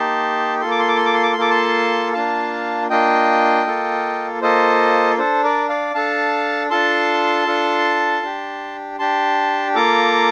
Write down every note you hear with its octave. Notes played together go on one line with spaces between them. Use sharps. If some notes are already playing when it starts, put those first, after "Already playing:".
Already playing: A#3 D#4 G4 A5 C6
A#3 F4 A4 C6
D6
C6
D6
C6
D6
C6
D6
C6
A#3 F4 A4 D6
A5 C6
A#3 D4 F4 F5 A5
A#3 D4 F4 D#5 G5
A#3 F4 A4
A#3 F4 A4 C5 D#5
D4 A4 C5
A#4 D5
D5 F5
D4 A4 F5 A5
D4 F4 A4 A5 C6
D4 F4 A4
D4 G4
D4 G4 A5 C6
A#3 F4 A4 A#5 D6